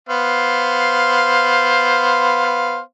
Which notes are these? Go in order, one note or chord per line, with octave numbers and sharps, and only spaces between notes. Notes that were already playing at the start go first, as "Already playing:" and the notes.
B3 C5 F5